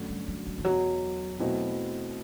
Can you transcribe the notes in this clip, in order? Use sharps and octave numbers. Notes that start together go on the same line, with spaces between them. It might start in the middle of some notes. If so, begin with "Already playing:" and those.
Already playing: F#2 D3 A3 D4 F#4
G3
G3
G3
E3
E1 E2 B2 F#3
B2 A3 C4 E4